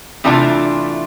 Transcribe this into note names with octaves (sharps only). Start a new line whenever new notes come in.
C3 E3 A3 D4 F4